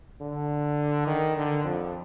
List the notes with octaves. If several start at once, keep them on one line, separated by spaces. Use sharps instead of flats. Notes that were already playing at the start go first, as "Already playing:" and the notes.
D3
D#3
D3
F2